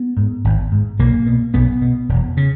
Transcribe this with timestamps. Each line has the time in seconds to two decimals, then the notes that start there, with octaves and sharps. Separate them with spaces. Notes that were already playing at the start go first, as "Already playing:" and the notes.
Already playing: B3
0.17 G#2
0.44 G#1
0.72 G#2
0.99 B1 A#3
1.26 B2
1.54 B1 B3
1.82 B2
2.09 E1
2.37 C#3